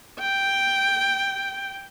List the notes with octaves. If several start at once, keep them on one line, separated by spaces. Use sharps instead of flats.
G5